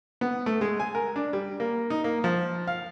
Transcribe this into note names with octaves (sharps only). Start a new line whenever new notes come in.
B3
A3
G#3
G#5
A#4
D4
G3
A#3
D#4
A#3
F3
F5